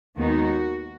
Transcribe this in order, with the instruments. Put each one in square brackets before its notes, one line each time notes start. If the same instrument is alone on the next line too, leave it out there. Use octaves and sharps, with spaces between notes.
[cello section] D#2 D#3 G#3 B3 D#4 F#4